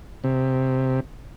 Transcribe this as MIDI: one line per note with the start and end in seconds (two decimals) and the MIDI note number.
0.24 1.00 48